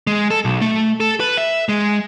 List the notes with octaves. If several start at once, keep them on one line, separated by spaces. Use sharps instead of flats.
G#3
A4
B1
A3
A4
B4
E5
G#3